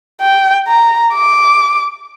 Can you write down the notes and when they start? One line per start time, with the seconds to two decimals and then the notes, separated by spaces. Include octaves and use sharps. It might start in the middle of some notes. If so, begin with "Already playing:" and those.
0.21 G5
0.68 A#5
1.14 D6